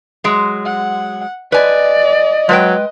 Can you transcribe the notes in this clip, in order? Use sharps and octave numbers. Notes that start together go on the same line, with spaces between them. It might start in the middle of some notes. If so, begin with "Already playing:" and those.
F#3 G#3
F#5
B4 D5 D#5 G#5
F#3 G#3 B4 G5